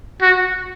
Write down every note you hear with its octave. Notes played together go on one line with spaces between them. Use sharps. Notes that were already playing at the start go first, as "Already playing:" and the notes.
F#4